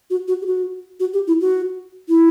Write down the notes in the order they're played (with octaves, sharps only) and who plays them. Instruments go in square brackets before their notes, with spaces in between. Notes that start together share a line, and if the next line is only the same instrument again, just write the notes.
[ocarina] F#4
F#4
G4
F#4
F#4
G4
E4
F#4
E4